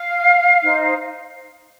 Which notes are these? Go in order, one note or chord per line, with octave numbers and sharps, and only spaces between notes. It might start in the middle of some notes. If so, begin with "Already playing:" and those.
Already playing: F5
D#4 C5